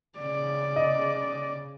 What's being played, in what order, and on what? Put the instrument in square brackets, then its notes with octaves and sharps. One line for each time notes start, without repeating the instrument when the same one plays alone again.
[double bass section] C#3 [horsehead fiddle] D5
[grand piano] D#5